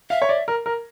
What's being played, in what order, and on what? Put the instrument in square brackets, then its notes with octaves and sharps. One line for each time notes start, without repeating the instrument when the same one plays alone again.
[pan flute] E5 [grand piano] F5
[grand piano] C#5
D5
A#4
A#4